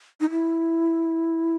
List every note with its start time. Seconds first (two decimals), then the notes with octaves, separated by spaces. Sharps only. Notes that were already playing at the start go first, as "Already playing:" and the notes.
0.20 D#4
0.30 E4